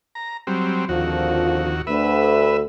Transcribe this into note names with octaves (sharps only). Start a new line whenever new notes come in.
A#5
F#3 G3 C4
G#1 D#2 D3 F3 F#4
D2 B4 E5